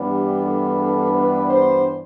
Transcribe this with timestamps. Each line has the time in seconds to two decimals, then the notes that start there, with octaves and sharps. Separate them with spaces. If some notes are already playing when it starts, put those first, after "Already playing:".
Already playing: G2 E3 G3 B3 D4
0.09 G4
0.45 A4
0.80 A4
1.14 B4
1.50 C5